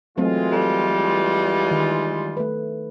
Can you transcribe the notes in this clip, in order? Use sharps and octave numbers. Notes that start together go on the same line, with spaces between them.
E3 F#3 G#3 A3 C4 F4
G3 A4
D#3
A3 B4